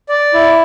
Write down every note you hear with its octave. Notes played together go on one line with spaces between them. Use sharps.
D5
E4